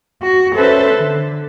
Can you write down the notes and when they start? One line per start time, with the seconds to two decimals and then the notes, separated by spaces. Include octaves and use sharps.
0.23 F#4
0.55 C#4 A4 B4 C5 E5
0.93 D3